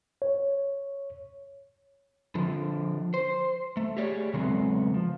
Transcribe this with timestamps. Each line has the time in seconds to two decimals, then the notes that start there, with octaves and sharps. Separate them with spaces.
0.22 C#5
2.35 D3 F3
3.14 C5
3.77 A3
3.97 G4 G#4 C#5 D5
4.34 C#3 F#3 G#3 A3 B3 C4
4.94 F3